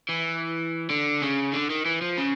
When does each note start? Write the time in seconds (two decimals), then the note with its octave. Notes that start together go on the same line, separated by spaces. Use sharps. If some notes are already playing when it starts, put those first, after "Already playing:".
0.09 E3
0.90 D3
1.22 C#3
1.53 D3
1.70 D#3
1.85 E3
2.02 F3
2.18 C#3